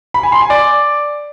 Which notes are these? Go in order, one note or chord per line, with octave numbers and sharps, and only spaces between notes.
B5
G#5
C6
G#5
D5